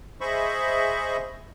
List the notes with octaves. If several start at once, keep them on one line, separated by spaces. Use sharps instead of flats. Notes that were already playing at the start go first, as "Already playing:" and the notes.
G#4 C5 D#5 E5 B5 C#6